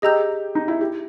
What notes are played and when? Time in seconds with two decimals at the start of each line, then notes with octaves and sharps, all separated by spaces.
0.02 G4 G#4 D#5 A#5 E6 G6
0.55 D#4
0.68 E4
0.81 G4